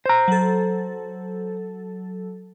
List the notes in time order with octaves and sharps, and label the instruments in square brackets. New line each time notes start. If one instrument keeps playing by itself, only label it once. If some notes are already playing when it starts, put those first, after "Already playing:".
[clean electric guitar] C5 A#5
[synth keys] F#3 A4